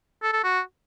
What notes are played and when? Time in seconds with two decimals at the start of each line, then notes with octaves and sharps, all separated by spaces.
0.23 A4
0.33 A4
0.44 F#4